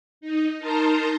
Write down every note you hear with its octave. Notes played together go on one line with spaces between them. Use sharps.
D#4
D#4 A#4 A5 A#5 C6